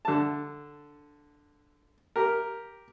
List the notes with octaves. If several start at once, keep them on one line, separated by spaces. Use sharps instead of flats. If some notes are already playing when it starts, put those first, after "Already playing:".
D3 A5
G4 A#4